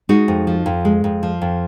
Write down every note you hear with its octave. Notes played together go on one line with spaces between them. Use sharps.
G#3 D#4 F#4
F2
F3
F2
G#3
F2
F3
F2